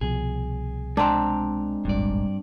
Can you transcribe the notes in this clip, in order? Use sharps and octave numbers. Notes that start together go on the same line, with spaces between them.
C2 B2 F3 G#4
G#3 C4 D4 G#5 A#5
D#1 G#1 G2 D5